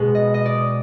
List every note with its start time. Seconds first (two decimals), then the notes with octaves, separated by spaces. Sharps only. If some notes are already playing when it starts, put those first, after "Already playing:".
Already playing: B2 G#3 B3
0.15 D#5
0.34 D#5
0.46 D5